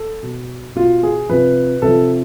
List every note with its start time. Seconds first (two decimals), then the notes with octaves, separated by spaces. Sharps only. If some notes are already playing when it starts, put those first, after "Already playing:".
Already playing: A4
0.23 B2
0.75 B2 F4
1.03 G#4
1.29 C3 F3 B4
1.82 C3 F3 A4